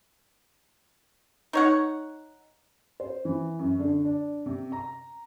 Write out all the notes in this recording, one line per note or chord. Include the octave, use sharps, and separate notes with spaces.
D#4 C#5 F#5
C5
E3
F#2
D3
D4
C3
A#5